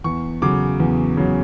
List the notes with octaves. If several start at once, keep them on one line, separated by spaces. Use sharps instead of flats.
E2 C#6
C#3 F#3 D6
E2
C#3 F#3